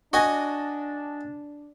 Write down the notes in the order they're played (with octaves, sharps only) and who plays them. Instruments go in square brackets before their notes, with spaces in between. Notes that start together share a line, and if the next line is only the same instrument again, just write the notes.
[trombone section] D4 [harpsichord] F#4 D#5 G#5